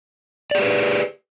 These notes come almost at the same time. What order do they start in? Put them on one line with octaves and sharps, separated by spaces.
D5 G#4 G4 B4